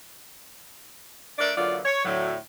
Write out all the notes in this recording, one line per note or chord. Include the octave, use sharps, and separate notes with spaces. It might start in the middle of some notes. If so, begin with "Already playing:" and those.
A3 D4 A#4 D5
E2 D3 F#3 A#3 F4 D5
C#5
A2 D3 F#3